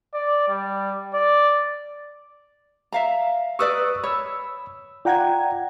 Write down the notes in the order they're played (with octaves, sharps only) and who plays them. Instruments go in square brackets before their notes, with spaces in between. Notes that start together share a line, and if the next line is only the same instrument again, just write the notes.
[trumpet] D5
G3
D5
[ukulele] E5 F5 A#5
[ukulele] A#4 B4 D5 [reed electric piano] C#6 D#6 E6
[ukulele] C#5 [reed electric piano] B5 E6
[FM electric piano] F4 F#5 G#6 [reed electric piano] D5 G5 A#5